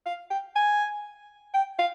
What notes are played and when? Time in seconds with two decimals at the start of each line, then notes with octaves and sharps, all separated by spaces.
0.06 F5
0.30 G5
0.56 G#5
1.54 G5
1.79 F5